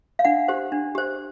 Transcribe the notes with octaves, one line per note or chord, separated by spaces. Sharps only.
F5
D4 F#5
G4 C5
D4
G4 C5